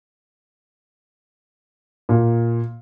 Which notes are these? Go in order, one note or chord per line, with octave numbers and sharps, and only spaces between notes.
A#2